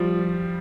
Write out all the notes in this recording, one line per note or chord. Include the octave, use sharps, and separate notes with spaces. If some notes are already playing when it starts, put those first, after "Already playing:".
Already playing: F3 G3